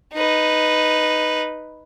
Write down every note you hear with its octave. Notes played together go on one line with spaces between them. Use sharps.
D#4 B4